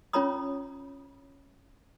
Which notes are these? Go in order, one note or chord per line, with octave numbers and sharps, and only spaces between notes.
C#4 F4 C#5 A#5 B5 D#6